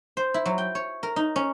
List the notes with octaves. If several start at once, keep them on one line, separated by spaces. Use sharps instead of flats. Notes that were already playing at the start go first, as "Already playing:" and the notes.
C5
E4
F#3
G5
C#5
A#4
D#4
C#4